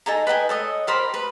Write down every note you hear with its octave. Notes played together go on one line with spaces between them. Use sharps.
D#4 A4 G#5 A#5
B4 D#5 G5 G#5
A4 C#5 D#5
G4 A#4 C5 B5
B4